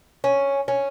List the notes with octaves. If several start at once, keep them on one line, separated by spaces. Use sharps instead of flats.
C#4
C#4